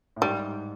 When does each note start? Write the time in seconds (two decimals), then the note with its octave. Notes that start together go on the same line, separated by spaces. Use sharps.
0.16 A2
0.22 G#2 G3